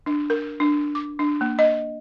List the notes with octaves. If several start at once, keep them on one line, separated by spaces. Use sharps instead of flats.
D4
A#4
D4
D6
D4
A#3
D#5